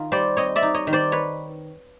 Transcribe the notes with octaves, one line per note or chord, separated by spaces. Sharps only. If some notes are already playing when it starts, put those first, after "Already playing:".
Already playing: D#3 D#4 F4
G3 C5 D5
C4 C#5 D#5
D5 E5
D#4
C#5 D#5
D#3
C5 D5
B4 C#5